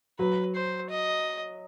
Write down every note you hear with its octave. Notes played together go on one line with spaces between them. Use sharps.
F#3 B4
C5
D#5